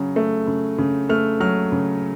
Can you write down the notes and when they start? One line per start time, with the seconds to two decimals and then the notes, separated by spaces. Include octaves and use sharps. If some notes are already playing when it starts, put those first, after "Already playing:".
Already playing: C#3 F#3
0.16 A3
0.47 C#3
0.78 C#3
1.09 A3 F6
1.40 F#3 F6
1.72 C#3